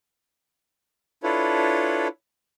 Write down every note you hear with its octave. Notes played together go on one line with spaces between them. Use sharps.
D4 E4 F4 A4 B4 C#5